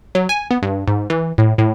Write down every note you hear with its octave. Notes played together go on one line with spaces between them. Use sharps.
F#3
G#5
B3
G2
G#2
E3
A2
A2